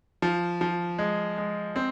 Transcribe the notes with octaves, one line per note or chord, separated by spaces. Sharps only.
F3
F3
G#3
G#3
C4